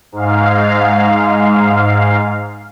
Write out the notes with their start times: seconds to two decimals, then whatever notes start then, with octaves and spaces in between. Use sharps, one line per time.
0.12 G#2 F5